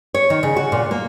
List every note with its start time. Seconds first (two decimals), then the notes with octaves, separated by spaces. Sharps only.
0.14 C#5
0.30 D#3
0.43 C#3
0.57 F#4
0.72 A#2
0.91 A#3